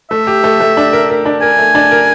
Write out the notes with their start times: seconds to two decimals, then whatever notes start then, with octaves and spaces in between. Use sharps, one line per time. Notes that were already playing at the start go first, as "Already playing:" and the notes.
0.11 A3 E5
0.27 G4
0.44 A3
0.60 A3
0.77 D4
0.93 A#4
1.10 A#4
1.25 D4
1.42 A#4 G#5
1.59 A3
1.75 D4
1.91 A#4